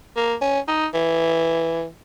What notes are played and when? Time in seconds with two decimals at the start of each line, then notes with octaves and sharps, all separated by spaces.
0.16 A#3
0.41 C#4
0.68 D#4
0.94 E3